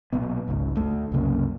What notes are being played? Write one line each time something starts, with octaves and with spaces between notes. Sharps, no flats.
B1 A#2 B3
G1 C#2 G#2
D2 A3
C2 F#2 C#3 A#3